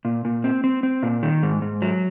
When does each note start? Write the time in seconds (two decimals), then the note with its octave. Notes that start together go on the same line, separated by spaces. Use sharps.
0.05 A#2
0.25 A#2
0.44 C4
0.64 C4
0.83 C4
1.03 A#2
1.23 D#3
1.43 G#2
1.62 G#2
1.82 F#3